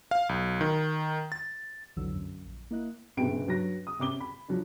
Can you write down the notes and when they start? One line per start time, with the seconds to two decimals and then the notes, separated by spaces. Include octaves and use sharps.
0.11 F5
0.29 B1
0.61 D#3
1.32 A6
1.96 B1 F2 D3 E3 F#3 E6
2.14 F#2
2.44 A#1
2.71 A#3 E4 D#5 F#6
3.17 F#1 B1 G2 C3 G5 D7
3.47 G2 F#3 A#6
3.87 D#6
3.99 C3 C#4 D6 G7
4.20 B5
4.48 F3 F#3 D4